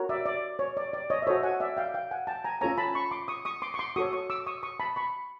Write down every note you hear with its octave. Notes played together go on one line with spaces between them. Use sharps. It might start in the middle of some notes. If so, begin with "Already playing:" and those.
Already playing: F#4 A#4 C#5
D5 E5
D5
C#5
D5
D5
C#5 D#5
E5
F#4 A4 C5 C#5 D#5
F#5 G#5
D5 E5
F5 G5
F5 G5
F#5 G#5
G5 A5
G#5 A#5
C#4 F4 A4 C#5 G#5 A#5
A5 B5
B5 C#6
C6 D6
C#6 D#6
C#6 D#6
C6 D6
C#6
C6 D6
F#4 A4 C#5 C#6 D#6
C#6 D#6
D6 E6
C#6 D#6
C#6 D#6
A5 B5
B5 C#6